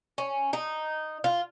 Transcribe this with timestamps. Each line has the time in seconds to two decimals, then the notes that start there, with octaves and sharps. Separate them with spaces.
0.18 C#4
0.53 D#4
1.24 F4